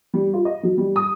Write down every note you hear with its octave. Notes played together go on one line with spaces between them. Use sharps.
G3
F4
D#5
F#3
G3
D#6